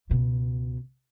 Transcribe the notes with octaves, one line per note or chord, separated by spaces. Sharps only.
C#2 B2